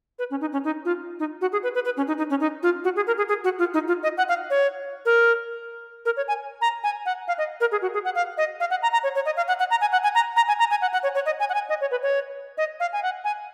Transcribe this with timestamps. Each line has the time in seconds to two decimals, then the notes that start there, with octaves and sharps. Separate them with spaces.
0.19 B4
0.31 C#4
0.41 D#4
0.53 C#4
0.64 D#4
0.85 F4
1.19 D#4
1.41 F#4
1.52 G#4
1.63 B4
1.75 B4
1.85 B4
1.97 C#4
2.08 D#4
2.18 D#4
2.30 C#4
2.40 D#4
2.63 F4
2.84 F#4
2.96 G#4
3.07 A#4
3.18 G#4
3.28 G#4
3.44 F#4
3.59 F4
3.74 D#4
3.88 F4
4.03 D#5
4.18 F#5
4.29 F5
4.50 C#5
5.05 A#4
6.05 A#4
6.17 C#5
6.28 G#5
6.61 A#5
6.84 G#5
7.06 F#5
7.28 F5
7.38 D#5
7.61 A#4
7.72 G#4
7.82 F#4
7.94 G#4
8.05 F#5
8.15 F5
8.38 D#5
8.60 F5
8.70 F#5
8.83 A#5
8.93 A#5
9.04 C#5
9.15 C#5
9.26 D#5
9.37 F5
9.48 F#5
9.59 F#5
9.71 A#5
9.81 G#5
9.92 F#5
10.03 G#5
10.15 A#5
10.36 A#5
10.48 G#5
10.59 A#5
10.70 G#5
10.82 F#5
10.93 F#5
11.03 C#5
11.15 C#5
11.26 D#5
11.40 G#5
11.49 F#5
11.54 G#5
11.69 D#5
11.81 C#5
11.91 B4
12.03 C#5
12.58 D#5
12.80 F5
12.93 G#5
13.03 F#5
13.25 G#5